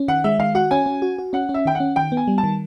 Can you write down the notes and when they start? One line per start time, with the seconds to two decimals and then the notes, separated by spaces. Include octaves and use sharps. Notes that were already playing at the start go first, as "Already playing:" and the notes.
Already playing: C#4
0.08 D#3 F#5
0.24 G#3 E5
0.39 D#3 F5
0.55 F#4 F#5
0.71 C#4 G#5
0.86 C#4
1.02 F#4
1.18 F#4
1.33 C#4 F#5
1.49 C#4
1.54 E5
1.65 D#3 G5
1.75 F#5
1.80 C#4
1.96 D#3 G5
2.12 B3
2.17 G#5
2.28 G3
2.38 A5
2.44 D#3